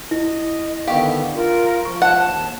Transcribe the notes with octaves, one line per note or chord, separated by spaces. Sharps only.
E4 D#5
D3 D#3 B3 G4 F5 C#6
F4 A#4
F3 C#6
F#5 A5
D#2 A5